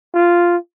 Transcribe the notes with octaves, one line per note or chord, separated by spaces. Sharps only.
F4